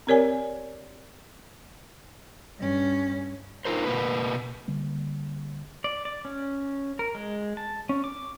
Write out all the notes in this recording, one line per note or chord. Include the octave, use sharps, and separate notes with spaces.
C4 G4 A#4 C#5 D5 G#5
G2 C#4
D#4 F4 A#4 C5
B2 A#3 B4
D3 G3 A#3
D5
D5
C#4
A#4
G#3
A5
C#4
D6